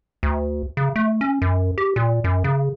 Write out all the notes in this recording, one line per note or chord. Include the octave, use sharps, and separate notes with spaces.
D2
C#3
A3
C#4
F#2
G4
A#2
F#2
C#3